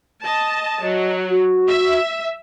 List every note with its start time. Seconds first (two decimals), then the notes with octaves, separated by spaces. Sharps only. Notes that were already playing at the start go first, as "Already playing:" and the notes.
0.23 D#5 A5
0.83 F#3 D#5
1.30 F#4
1.67 E5